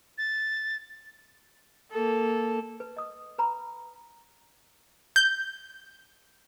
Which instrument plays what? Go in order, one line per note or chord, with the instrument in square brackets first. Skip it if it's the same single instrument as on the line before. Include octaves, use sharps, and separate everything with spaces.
[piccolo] A6
[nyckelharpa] A#3 A4
[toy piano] B4
D#5 D#6
B4 A#5 B5
[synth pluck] G6